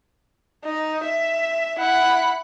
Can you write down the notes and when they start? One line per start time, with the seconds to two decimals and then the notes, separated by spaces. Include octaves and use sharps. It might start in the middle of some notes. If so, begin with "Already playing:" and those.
0.64 D#4
1.04 E5
1.79 E4 F#5 B5